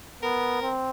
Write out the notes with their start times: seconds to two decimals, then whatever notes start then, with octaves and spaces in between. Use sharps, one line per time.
0.23 B3 A#4
0.62 C4